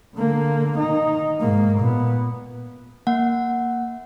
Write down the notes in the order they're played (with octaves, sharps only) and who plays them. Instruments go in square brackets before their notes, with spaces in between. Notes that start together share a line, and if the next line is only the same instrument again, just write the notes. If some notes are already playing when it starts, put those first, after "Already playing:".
[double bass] D3 A#3
D#3 D#4
G#2 A#3
A#2 B3
[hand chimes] A#3 F#5